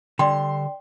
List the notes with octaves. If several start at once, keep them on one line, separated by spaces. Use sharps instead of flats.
D3 G3 D5 G5 C6